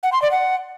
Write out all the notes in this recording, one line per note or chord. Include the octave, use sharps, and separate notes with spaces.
F#5
C6
D5
F#5